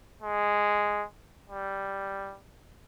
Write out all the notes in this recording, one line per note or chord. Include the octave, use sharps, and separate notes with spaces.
G#3
G3